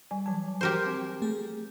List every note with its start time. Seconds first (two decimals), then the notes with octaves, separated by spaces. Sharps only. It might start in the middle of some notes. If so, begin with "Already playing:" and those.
0.11 G3 G#5
0.26 E3 F#3 G#5 A5
0.61 E3 F3 F#4 G4 A#4 C5
0.86 C4
1.22 A3 G#4